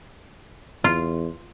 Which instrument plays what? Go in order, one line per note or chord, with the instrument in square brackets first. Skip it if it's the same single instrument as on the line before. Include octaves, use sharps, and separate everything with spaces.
[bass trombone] E2 [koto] F4